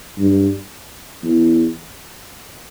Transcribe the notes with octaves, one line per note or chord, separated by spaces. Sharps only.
G2
E2